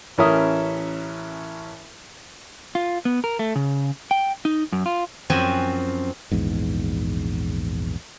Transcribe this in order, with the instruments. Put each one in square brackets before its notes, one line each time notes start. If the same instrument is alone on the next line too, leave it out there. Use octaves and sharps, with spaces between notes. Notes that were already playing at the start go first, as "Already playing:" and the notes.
[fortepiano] A1 E3 C#4 A#4 E5 D#6
[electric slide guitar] F4
B3
A#4
A3
C#3
G5
D#4
F#2
F4
[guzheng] F#2 F3 C4 F#4 G#5
[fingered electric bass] A#1 E2 G#2